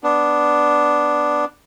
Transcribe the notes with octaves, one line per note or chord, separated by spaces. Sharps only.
B3 D4